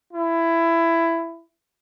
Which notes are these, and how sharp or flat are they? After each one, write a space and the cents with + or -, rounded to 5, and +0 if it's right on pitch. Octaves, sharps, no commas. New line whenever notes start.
E4 +15